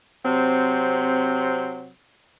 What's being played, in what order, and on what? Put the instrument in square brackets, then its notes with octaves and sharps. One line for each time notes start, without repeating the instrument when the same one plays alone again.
[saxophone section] C3 F#3 C4